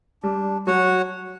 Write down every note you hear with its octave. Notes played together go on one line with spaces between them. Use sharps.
G3 D4
F#3 F#4 C#5 F#5